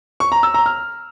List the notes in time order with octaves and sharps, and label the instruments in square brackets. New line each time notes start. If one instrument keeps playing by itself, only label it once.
[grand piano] C#6
A#5
E6
A#5
F6